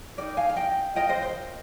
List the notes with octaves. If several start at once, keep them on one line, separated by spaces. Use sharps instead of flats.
D#4 G4 A#4 D5
F5 G#5
F5
D#5 G5
F4 A#4 D#5 G5
C5 D#5
C5